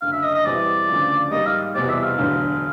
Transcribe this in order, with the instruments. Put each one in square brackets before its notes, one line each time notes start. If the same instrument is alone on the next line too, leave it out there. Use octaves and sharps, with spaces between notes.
[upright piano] F#1 F#2 D3 [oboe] F5
[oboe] E5
D#5
D#5
[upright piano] E2 B2 G3 C4 E4 [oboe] D5
[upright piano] D2 C#3 F3
[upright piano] G#2 D#3 G3 A#3 D#4 [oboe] D#5
[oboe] F5
[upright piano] F1 E2 B2 G3 C4 [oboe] D5
[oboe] E5
F5
[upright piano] E1 D2 D3 F#3